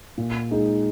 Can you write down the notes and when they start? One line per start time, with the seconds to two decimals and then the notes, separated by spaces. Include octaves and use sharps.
0.18 A#2
0.51 G#3 D#4